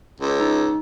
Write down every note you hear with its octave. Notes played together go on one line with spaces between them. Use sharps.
C#2
D#4